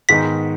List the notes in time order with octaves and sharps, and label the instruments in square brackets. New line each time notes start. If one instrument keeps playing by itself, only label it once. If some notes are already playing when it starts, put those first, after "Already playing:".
[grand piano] G#2 D#3 G#3 B3 D#4 [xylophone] B6